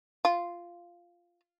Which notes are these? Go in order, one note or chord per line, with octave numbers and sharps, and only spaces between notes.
F4